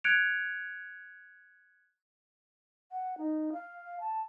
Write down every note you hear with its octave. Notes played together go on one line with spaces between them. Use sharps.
F#6 G#6 C#7 D7 F7
F#5
D#4
F5
A5